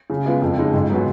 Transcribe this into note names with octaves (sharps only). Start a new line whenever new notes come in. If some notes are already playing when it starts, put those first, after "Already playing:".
C#3
G#3 B3 F4 G#4
F2
C#3 G#3 D#4
G#2
F#3 B3 F#4